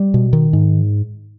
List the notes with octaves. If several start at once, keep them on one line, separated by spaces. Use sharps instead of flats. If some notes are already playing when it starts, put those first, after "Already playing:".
Already playing: G3
B2
D#3
G#2